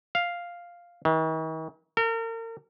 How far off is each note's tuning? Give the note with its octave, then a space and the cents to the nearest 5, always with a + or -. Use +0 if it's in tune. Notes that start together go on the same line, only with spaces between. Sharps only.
F5 +0
D#3 +45
A#4 -40